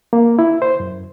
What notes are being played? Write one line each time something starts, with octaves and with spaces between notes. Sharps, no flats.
A#3
E4
C5
F#2